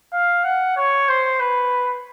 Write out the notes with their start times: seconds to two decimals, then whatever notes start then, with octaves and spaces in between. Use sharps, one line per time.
0.13 F5
0.44 F#5
0.76 C#5
1.09 C5
1.40 B4